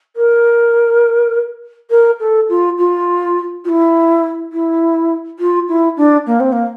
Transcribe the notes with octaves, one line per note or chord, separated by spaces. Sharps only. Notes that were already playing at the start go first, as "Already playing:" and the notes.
A#4
A#4
A4
F4
F4
F4
E4
E4
F4
E4
D4
A#3
C4
A#3